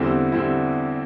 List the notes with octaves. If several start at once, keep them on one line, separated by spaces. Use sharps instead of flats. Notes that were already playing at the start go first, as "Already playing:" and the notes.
Already playing: E2 D3 G3 C4 E4
D3 G3 C4 E4